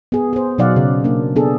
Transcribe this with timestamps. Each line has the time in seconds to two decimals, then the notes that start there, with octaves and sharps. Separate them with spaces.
0.12 B3 G#4
0.33 G#4 C5
0.58 B2 F#3 D#4 D5 F5 F#5
0.76 C#3
1.04 A#3 D4
1.36 B3 D4 G#4 A4